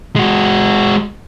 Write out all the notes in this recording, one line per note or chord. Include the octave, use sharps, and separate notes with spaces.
G#3 F#4